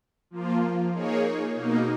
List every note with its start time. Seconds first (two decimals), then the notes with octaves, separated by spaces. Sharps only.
0.31 F3 A#3 F4
0.94 A#3 D#4 G#4 C#5
1.55 B2 A#3 D#4